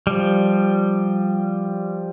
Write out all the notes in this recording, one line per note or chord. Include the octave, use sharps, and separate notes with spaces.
F3 G3